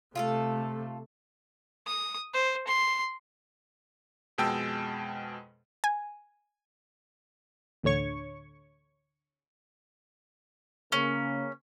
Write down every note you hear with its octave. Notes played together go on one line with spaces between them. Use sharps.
C3 A3 F4 G#4 A4
D#6
C5
C6
F2 B2 G#3 G5 A5 E6
G#5
A1 D2 D3 C#5 C#6
C#3 A#3 C#4